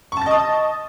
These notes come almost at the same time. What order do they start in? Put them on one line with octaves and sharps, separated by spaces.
C#6 A5 A6 D#5 D#6